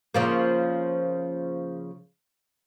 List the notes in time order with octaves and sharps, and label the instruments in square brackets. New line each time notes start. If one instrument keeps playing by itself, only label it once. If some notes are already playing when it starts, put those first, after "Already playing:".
[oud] C#3 F3 A#3